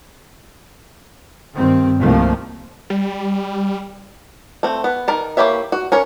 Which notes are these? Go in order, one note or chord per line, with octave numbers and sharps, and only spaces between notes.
G2 D#3 C4
C2 D#3 F3 A3 A#3
G3
A3 C4
B3
D#3 A#4 A5
A#3 E4 G4 C#5 E5
F#4
C#4 A#4 C#5